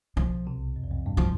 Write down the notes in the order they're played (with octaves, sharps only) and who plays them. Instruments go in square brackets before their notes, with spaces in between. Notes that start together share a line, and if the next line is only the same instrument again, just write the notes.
[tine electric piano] B1 B2 [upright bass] F3
[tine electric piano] C2 C3
F2
E2
F2
G1 G2
[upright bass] F3